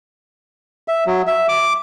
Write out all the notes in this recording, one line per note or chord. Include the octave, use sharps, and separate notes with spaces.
E5
F#3
E5
D6